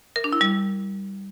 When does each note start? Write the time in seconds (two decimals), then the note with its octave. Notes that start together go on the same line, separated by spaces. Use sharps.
0.16 A#4
0.24 D4
0.33 E4
0.41 G3